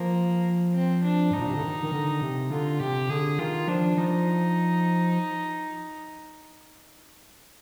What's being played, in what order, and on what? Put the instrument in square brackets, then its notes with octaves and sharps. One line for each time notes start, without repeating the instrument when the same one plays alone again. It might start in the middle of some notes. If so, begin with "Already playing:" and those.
Already playing: [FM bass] F3 [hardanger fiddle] A#3
[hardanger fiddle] C4
D4
[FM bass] G#2 [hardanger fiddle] D#4
[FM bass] A#2
C3
D3
D#3
D#3
D3
C3
[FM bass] D3 [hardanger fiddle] F4
[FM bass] C3 [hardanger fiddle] G4
[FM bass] D3 [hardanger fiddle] G#4
[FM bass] D#3 [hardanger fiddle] F4
[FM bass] F3 [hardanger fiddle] D4
[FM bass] F3 [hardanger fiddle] D#4